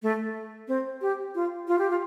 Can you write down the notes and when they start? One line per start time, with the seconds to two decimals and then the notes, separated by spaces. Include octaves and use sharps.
0.03 A3
0.68 C4
1.02 G4
1.35 F4
1.68 F4
1.79 G4
1.90 F4